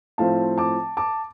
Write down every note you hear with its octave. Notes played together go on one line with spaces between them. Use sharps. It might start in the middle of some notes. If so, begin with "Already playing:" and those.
A2 F3 C4 F5 A5
A5 D6
A5 D6